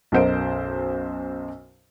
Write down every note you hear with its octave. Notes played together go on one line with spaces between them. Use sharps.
B1 F#2 A#4 C5 D#5 D7